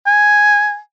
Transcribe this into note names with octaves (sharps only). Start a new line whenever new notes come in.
G#5